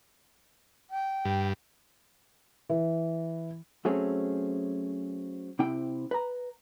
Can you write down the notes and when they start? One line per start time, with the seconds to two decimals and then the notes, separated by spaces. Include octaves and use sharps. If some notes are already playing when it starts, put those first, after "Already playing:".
0.90 G5
1.25 G2
2.69 E3
3.85 F#3 A3 C4 C#4 G#4
5.59 C3 C4 E4 G5
6.11 B4 A#5